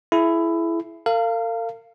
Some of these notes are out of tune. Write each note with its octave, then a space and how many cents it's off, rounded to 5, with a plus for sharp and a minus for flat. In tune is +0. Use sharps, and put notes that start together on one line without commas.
E4 +15 G#4 +35
A#4 -45 F5 -15